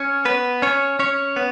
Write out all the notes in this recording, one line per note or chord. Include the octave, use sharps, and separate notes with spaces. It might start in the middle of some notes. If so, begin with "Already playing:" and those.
Already playing: C#4 C#5
B3 B4
C#4 C#5
C#4 C#5
B3